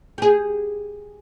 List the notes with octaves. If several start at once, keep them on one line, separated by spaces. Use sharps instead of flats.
G4 G#4